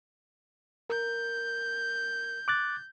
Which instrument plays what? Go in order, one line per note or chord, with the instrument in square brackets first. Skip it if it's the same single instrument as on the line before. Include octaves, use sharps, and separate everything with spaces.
[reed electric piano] A#4 [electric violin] G6
[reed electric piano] D6 F#6 A6